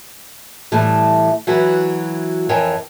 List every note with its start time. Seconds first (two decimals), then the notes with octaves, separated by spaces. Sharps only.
0.72 A2 E3 G3 A3
1.47 E3 F#3 F#4 B4
2.49 F2 E3 A#4 C#5 G5 G#5